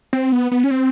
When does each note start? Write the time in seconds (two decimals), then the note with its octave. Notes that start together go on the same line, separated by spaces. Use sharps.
0.13 C4
0.32 B3
0.52 B3
0.64 C#4
0.71 C4